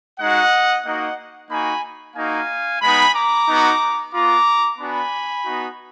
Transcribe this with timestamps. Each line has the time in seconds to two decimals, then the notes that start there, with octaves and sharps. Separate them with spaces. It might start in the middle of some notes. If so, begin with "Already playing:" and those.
0.20 G#3 D#4 F#4 D#5 F#5
0.85 A#3 D#4 F#4 D#5 F#5
1.50 A#3 D#4 F#4 G#5 B5
2.16 A#3 D#4 F#4 F5 G#5
2.82 G#3 B3 D#4 G#5 B5
3.15 A#5 D6
3.48 B3 D#4 F#4
4.13 B3 F4 A#5 D6
4.78 B3 D4 F#4 G#5 B5
5.44 B3 D#4 F#4